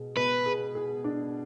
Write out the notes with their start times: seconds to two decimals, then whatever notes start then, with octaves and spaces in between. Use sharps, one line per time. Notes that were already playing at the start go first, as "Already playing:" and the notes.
Already playing: B2 G#4
0.17 B2 B4
0.46 G#4
0.75 G#4
1.04 D4